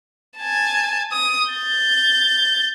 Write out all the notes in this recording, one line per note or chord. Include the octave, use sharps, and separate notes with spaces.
G#5 A5
D#6
G6 A6